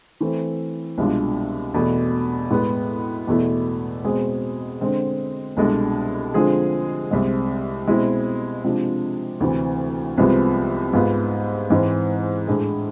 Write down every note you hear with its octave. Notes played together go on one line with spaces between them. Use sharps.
E3 A3 C4
C2 B2 G#3 D4 F4
E2 B2 A3
A2 G#3 B3
E2 B2 A3 E4
B2 G#3 C4 G#4
D3 G#3 C4
C2 B2 G#3 D4 A4
D3 F3 G#3 C4 G#4
C2 C3 G#3
B2 G#3 C4 E4
C3 F3 G#3 D4
D2 C3 E3
C2 C3 F3 G#3 B3
G#2 G#3 B3 F4
G#2 E3 G#3 C4
A2 G#3 D4 G#4